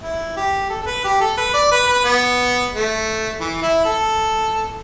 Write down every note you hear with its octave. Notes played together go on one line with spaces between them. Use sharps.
E4
G4
A4
A4
B4
G4
A4
B4
D5
B4
B4
B3
A3
E3
E4
A4